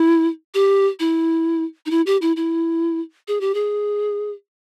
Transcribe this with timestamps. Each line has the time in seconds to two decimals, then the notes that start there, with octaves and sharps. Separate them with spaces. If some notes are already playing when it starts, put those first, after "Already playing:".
Already playing: E4
0.54 G4
1.00 E4
1.86 D#4
1.91 E4
2.06 G4
2.22 E4
2.36 E4
3.28 G#4
3.41 G4
3.54 G#4